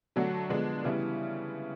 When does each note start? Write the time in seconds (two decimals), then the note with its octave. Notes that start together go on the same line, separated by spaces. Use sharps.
0.16 D3 F#3 A3 D4 F#4
0.50 D3 F3 G#3 B3 D4
0.84 C#3 E3 G3 B3 E4